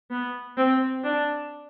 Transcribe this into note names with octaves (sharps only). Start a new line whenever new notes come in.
B3
C4
D4